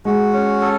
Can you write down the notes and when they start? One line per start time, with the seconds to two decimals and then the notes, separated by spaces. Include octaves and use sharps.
0.05 G#3 F#4
0.33 C#4
0.61 A4